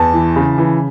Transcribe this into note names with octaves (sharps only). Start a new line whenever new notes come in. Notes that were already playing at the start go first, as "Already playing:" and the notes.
Already playing: E2 A5
E3
C#3
E3